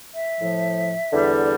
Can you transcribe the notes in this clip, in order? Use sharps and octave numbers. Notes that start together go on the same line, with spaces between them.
E5
A2 F3
E2 D3 G3